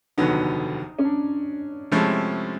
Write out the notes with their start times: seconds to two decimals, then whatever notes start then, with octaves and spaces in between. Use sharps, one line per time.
0.17 F1 D#2 D3 F#3 B3 D#4
0.99 C#4
1.04 D4
1.92 C3 F3 G#3 A3 C#4 E4